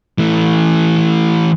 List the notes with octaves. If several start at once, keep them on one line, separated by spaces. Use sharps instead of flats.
E3 A3